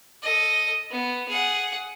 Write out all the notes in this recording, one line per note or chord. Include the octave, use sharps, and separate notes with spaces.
A4 D#5
B3
G#4 F#5